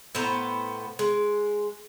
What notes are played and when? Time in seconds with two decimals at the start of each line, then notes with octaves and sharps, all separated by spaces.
0.15 A2 B3 C5 A#5
0.99 G#3